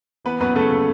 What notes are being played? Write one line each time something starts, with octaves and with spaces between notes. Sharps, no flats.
E3 B3 B4
F#2 B3 B4
C#3 A3 A4
C#3